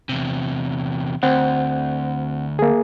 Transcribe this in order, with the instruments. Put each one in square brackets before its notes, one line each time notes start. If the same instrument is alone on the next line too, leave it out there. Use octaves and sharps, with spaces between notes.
[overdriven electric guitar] E2 C3
[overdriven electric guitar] D2 [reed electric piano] C4 F#5
[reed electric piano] A#3 G#4